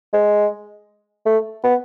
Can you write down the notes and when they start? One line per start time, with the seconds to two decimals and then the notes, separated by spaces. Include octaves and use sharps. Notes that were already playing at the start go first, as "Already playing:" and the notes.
0.13 G#3
1.26 A3
1.63 B3